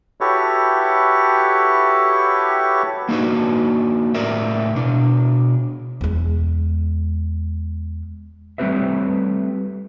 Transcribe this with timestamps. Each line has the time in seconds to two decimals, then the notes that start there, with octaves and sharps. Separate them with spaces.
0.21 E4 F#4 G4 A4 B4 C#5
3.09 A#3 D4 D#4 F#4 B4
4.14 A2 A#4 D5 E5
4.75 B2 D4
6.01 E2 G#3
8.58 G3 A3 C4 G4 B4 E5